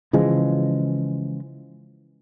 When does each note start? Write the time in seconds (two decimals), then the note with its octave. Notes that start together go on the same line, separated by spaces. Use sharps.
0.13 C#3 E3 F3 G#3